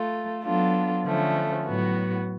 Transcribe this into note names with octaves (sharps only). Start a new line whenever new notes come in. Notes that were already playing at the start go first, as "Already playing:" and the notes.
Already playing: A3 F4 A4
F#3 B3 D4 F4 A4
D3 F3 A3 C#4
A2 F#3 B3 F#4